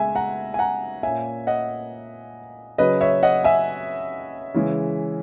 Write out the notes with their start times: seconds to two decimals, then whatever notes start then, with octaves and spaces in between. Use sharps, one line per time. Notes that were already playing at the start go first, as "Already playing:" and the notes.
Already playing: C#3 G#3 B3 E5 G#5
0.15 F#5 A#5
0.54 G#5
0.59 F#5 A#5
1.03 A#2 A#3 C#4 E5 G#5
1.47 D#5 F#5
2.78 C#3 F#3 C#4 B4 D#5
3.01 C#5 E5
3.23 D#5 F#5
3.44 E5 G#5
4.54 C#3 E3 G#3 C#4